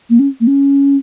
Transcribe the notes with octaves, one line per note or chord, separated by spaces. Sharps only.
A#3
C#4
A#3
C#4